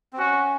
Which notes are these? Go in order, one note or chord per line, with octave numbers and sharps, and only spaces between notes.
C4
C#4 F#4